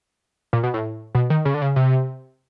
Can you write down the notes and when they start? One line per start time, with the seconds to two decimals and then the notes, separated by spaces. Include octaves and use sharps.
0.53 A#2
0.63 B2
0.74 A2
1.15 B2
1.30 D#3
1.45 C#3
1.54 D3
1.62 C#3
1.76 C3